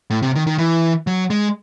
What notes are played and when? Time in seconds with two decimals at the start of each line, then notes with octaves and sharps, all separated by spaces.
0.10 A2
0.22 C3
0.35 D#3
0.47 D#3
0.58 E3
1.07 F#3
1.30 G#3